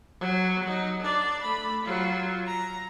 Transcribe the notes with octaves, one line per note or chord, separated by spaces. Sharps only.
F#3
F#3 D#4
D4 D5
A3 B5
F#3 F4
A#5